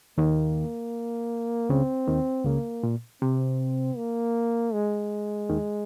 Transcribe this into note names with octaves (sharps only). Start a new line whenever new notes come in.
D#2 D#3 A#3
C#2 C#3 C4
D#2 D#3
C#2 C#3 A#3
A#2
C3 C4
A#3
G#3
D#2 D#3